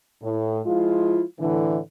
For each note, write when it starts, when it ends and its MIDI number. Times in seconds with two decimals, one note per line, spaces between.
0.22 0.60 45
0.65 1.21 53
0.65 1.21 56
0.65 1.21 64
0.65 1.21 65
1.39 1.77 45
1.39 1.77 50
1.39 1.77 52